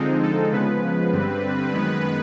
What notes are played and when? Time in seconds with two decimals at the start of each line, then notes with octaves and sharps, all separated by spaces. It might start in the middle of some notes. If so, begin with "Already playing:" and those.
Already playing: D3 F3 G#3 C4 D#4
0.23 A4
0.52 C#3 F3 G#3 B3 B4
1.12 G2 D3 G3 C4
1.73 F#2 D#3 G#3 B3